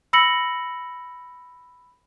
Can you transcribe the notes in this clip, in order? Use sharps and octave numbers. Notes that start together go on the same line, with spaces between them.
B5 E6 A#6 C#7 F#7